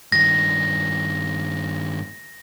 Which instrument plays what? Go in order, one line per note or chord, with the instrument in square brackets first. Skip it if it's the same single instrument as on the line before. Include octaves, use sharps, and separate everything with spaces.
[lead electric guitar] G2 D#3 [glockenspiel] A#6